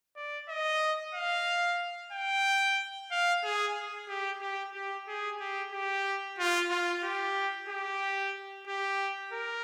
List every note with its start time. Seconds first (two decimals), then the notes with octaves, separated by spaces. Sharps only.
0.16 D5
0.49 D#5
1.14 F5
2.12 G5
3.11 F5
3.44 G#4
4.08 G4
4.41 G4
4.74 G4
5.07 G#4
5.40 G4
5.72 G4
6.38 F4
6.71 F4
7.03 G4
7.69 G4
8.67 G4
9.32 A#4